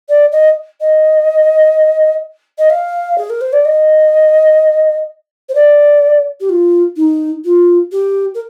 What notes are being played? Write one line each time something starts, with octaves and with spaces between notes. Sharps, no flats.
D5
D#5
D#5
D#5
F5
G#4
A#4
C5
D5
D#5
C5
D5
G4
F4
D#4
F4
G4
A#4